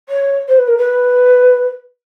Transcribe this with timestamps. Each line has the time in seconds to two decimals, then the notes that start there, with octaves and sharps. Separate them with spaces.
0.09 C#5
0.48 C5
0.58 B4
0.68 A#4
0.78 B4